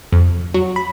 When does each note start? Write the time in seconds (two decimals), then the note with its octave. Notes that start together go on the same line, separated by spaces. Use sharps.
0.12 F2
0.54 F#3
0.76 B5